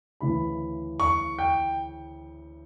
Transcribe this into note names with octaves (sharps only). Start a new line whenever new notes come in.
D2 C#3 E3 B5
C#6
G5